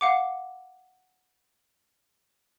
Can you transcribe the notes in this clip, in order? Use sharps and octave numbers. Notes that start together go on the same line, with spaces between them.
F5 F#5 D6